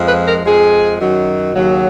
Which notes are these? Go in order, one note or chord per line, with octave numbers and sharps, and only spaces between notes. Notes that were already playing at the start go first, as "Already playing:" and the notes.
Already playing: F2 F3 G#3
B4
A#4
F2 F3 G#3 G#4
F#2 D#3 F#3
D#2 C#3 F#3